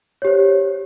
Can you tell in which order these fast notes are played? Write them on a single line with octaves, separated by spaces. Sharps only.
C#5 G4 C5